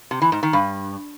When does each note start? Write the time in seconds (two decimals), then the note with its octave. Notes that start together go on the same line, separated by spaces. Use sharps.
0.11 C3
0.22 E3
0.32 G#2
0.43 D#3
0.53 G2